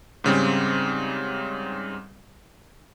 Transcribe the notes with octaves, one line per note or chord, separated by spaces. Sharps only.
G#2 C#3 G3 C4